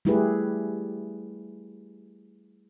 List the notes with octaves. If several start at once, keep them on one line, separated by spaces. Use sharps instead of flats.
G3 A3 E4 G4 G#4 B4